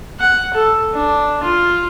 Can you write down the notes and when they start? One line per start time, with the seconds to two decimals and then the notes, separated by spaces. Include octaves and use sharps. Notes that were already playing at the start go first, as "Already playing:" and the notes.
0.20 F#5
0.54 A4
0.95 D4
1.44 F4